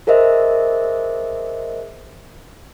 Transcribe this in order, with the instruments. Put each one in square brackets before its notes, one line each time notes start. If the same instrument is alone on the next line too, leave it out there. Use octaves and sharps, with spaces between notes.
[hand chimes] G#4 A#4 C5 D#5 E5